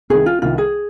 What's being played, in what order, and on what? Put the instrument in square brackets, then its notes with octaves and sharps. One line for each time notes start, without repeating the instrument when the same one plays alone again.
[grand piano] C2 C3 D#3 [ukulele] G#4
[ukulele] F4
[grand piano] C2 C3 D#3 [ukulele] F4
[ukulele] G#4